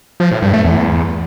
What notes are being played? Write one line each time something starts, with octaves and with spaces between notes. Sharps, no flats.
F3
A2
G2
A3
E2